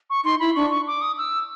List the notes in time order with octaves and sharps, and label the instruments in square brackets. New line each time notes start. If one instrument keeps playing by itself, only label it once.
[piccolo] C#6
[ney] D#4 [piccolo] C6
[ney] E4 [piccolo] B5
[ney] D4 [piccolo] C#6
[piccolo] C#6
D6
D#6
E6